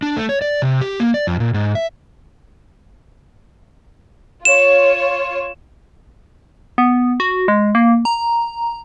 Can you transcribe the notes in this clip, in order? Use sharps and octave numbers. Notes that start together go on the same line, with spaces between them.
D4
A3
C#5
D5
C3
G4
A#3
D5
F2
A#2
G#2
E5
F4 C#5 E7
B3
F#4
G#3
A#3
A#5